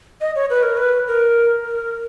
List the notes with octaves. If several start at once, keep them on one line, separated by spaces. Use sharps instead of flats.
D#5
C#5
B4
A#4
B4
A#4
A#4